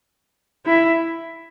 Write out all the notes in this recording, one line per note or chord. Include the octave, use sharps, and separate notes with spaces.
E4